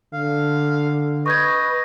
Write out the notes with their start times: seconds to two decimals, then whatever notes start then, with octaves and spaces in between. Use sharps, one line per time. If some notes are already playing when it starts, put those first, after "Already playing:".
0.13 D3 F5
1.26 B4 D#5 C#6 G6 G#6